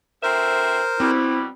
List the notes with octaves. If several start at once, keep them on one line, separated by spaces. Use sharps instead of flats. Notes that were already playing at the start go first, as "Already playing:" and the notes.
D2 C4 A#4 C5 E5
B2 G3 C4 E4